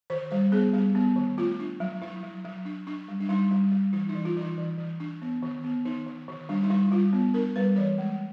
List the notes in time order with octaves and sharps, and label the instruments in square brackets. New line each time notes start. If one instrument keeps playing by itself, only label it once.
[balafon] D#3 C5
G3 C5
B3 G#4
G3 G4
B3
D#3
A3 F4
D4
F#3
F#3 E4
F#3
F#3
D4
D4
G3
D4
G3 D#4
G3
G3
E3 E4
D#4
E3
F4
E3
D#4
E3
E3
D4
B3
D#3
B3
D#3 D#4
D#3
D#3
G3 D4
D#4
G3 E4
G3 F4
B3
D4 A#4
G3 B4
E3 C#5
G#3